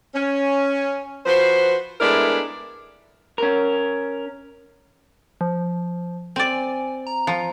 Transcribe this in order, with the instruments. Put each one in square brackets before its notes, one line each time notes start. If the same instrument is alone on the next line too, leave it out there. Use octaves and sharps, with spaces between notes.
[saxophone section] C#4
F3 F#4 B4 C5
G#3 A3 B3 D4 E4 A#4
[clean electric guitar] C#4 A#4
[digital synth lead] F3
[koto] C4 D5 [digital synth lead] G#5
[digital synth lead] A#5
[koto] F3